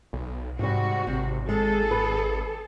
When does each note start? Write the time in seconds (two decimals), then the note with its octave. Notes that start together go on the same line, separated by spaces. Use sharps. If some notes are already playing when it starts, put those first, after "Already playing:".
0.13 B1
0.59 G#2 C3 G3 F#4
1.07 G#1 C3
1.49 G#3 G#4 A4
1.91 B4